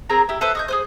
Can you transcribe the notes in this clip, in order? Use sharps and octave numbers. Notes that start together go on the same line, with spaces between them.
C4 G#4 A#4 A#5
E4 G4
A4 B4 C5 E5
D#5 C#6 G6
G#4 B4 C5